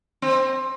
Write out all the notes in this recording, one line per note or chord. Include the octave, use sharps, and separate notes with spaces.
C4